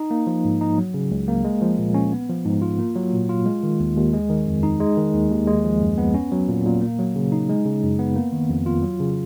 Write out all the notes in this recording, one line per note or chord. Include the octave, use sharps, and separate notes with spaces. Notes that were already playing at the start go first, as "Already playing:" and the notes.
Already playing: D#4
A#3
F3
G#2
D#4
F#3
C#3
C#2
A#3
G#3
F3
A#2
C#4
B3
F3
G#2
F4
A#3
F#3
A#2
F4
G#3
D#3
D#2
D#2
G#3
D#3
F2
D#4
G#3
D#3
D#2
D#2
G#3
F3
F#2
B3
C#4
F#3
A#2
A#2
A#3
F#3
C#3
D#4
G#3
C#3
F#2
B3
A#3
D#3
F2
F4
F#3
C#3